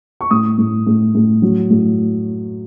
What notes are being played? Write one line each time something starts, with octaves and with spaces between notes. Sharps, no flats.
C#6
A2 D#6
A2
A2
A2
F#3
A2